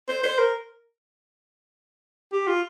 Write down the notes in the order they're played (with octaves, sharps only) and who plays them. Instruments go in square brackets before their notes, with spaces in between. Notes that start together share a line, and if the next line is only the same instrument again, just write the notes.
[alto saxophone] C5
C5
A#4
G4
F4